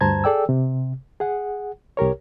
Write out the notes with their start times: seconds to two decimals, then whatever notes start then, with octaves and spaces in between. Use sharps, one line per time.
0.01 D2 G2 C5 A5 A#5 G#6
0.24 G#4 A4 D5 G5 E6
0.49 C3
1.20 G#4 F#5
1.97 C2 G4 A#4 C#5